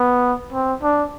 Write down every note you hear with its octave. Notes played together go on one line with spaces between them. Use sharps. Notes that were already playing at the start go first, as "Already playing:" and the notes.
Already playing: B3
C4
D4